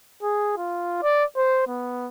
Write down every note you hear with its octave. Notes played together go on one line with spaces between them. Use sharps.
G#4
F4
D5
C5
B3